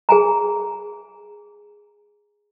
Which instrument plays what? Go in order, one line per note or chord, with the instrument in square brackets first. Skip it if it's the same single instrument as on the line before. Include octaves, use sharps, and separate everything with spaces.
[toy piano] G#4 G#5 A#5